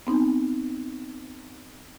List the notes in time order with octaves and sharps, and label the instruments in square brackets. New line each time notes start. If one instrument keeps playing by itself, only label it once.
[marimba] B3 C4 D#4